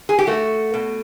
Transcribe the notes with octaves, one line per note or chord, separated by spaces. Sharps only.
G#4
G4
A3 F#4
B2